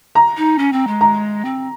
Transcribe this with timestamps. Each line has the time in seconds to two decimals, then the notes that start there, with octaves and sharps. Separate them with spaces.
0.15 A#5
0.37 D#4
0.58 C#4
0.73 C4
0.87 G#3
1.01 A#5
1.45 C4